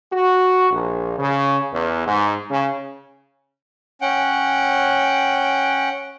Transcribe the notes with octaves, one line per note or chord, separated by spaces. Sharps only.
F#4
A#1
C#3
E2
G#2
C#3
C#4 F#5 G5